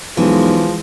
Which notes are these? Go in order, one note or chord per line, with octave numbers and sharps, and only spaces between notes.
B1 E3 F3 G#3